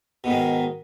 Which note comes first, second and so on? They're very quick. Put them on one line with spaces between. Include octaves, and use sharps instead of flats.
B2 G#2 D#3